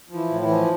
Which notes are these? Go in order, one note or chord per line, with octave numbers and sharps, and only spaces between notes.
F3
E3 E4
A2
E3 E4
F3